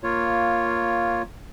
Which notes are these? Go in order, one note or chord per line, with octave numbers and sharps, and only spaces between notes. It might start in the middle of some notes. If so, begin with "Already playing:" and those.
A#3 F4 C#5